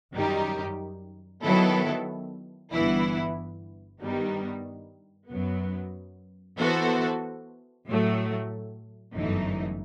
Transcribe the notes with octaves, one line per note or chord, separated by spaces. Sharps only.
F#2 D#3 G3 D#4 G4
D#3 F#3 B3 E4 A4
G1 G2 E3 B3 E4
G2 D#3 G3 B3 D#4
F#2 F#3 B3
E3 B3 F#4 A4 C5
A2 F#3 A3
G1 F#2 E3 A3 D#4